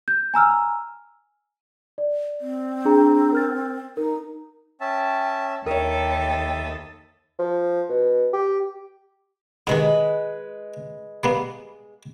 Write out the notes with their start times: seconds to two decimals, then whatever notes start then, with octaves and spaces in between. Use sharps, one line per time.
0.08 G6
0.34 G#5 A#5 E6 F6
1.98 D5
2.41 C4
2.85 D4 G#4 A#5
3.33 A#4 F6 A6
3.97 D#4 A#4
4.81 C#4 E5 G5 A5
5.66 D#2 A4 A#4 C#5 E5 G5 D#6
7.39 F3
7.89 B2
8.33 G4
9.67 G#2 C3 D#3 G#3 B4
11.24 G3 A#3 B3